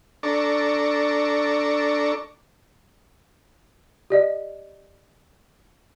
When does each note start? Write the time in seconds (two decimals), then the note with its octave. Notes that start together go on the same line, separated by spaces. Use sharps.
0.23 D4 A4 D5 A#5 C#6
4.10 G4 D5 D#5